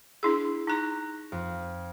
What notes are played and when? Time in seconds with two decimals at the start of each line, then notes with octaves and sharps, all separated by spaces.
0.23 D4 E4 G#4
0.67 D#4 A#5 C#6 F#6 A#6
1.32 F2